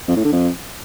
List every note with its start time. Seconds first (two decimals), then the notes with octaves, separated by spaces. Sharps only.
0.08 F2
0.16 A2
0.24 D3
0.32 F2